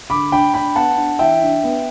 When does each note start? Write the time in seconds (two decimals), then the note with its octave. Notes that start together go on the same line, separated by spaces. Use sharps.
0.10 D3 B5 D6
0.32 D4 G5 B5
0.54 D4 G5 B5
0.76 B3 F#5 A5
0.97 D4
1.19 E3 E5 G5
1.42 D4
1.63 B3